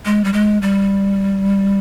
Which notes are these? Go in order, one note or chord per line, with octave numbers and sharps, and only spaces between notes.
G#3
G3
G#3
G3